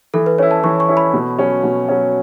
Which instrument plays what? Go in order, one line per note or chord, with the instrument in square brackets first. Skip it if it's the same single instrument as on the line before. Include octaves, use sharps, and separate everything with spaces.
[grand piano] E3 [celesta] A4
[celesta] B4
[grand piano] C#4 E4 [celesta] C#5
[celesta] A5
[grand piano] E3 [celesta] C#6
[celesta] C#6
[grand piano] C#4 E4
[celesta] B5
[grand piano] B2
F#3 C#4
B2
F#3 C#4